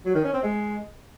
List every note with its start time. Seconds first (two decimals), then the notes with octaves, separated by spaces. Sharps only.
0.05 F#3
0.14 D#3
0.24 C#4
0.33 C4
0.43 G#3